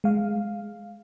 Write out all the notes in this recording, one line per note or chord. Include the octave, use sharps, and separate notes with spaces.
G#3 F5